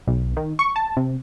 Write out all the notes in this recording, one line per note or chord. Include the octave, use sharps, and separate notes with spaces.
B1
D#3
C#6
A5
C3